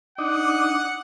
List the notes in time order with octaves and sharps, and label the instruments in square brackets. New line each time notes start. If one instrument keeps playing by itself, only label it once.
[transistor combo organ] D4 D#4 [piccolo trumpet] F#5